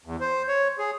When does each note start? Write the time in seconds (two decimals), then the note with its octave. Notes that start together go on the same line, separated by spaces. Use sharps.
0.05 E2
0.20 C5
0.48 C#5
0.78 G#4